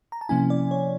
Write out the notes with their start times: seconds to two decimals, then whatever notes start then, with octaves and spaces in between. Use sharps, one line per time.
0.12 A#5
0.21 A5
0.29 C3 F3 A#3 C#4 E4 G#5
0.50 D5
0.71 C#5